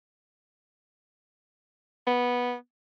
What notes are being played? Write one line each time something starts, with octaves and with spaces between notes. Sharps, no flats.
B3